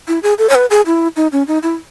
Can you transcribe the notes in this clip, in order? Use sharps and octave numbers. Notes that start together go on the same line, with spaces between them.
E4
G#4
A4
C#5
B4
G#4
E4
D#4
C#4
D#4
E4